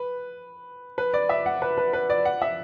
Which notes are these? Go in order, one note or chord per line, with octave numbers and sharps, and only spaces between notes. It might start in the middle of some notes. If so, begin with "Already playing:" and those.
Already playing: B4
B4
D5
E5
F#5
B4
B4
B4
D5
F#5
E5